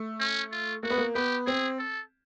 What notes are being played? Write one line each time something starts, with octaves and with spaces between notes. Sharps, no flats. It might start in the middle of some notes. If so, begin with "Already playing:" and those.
Already playing: A3
C#4
F4
A#3 F#4
B3
A#3
B3 G4
C4 G#4
A4